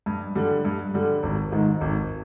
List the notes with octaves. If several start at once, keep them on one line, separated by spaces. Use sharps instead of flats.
G2
D3 G3
G2
D3 G3
G#1
G#2 D#3
G#1